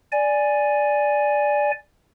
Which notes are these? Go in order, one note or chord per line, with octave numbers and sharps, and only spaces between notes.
D5 G#5